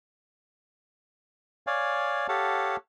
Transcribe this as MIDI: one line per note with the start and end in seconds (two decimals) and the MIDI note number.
1.67 2.27 73
1.67 2.27 74
1.67 2.27 77
1.67 2.27 80
2.29 2.76 67
2.29 2.76 69
2.29 2.76 73
2.29 2.76 77
2.29 2.76 78
2.29 2.76 81